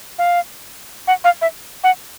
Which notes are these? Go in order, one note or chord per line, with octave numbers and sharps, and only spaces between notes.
F5
F#5
F5
E5
F#5